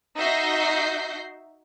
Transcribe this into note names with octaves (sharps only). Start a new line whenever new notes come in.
D#4 F#4 E5 G6 A#6 C7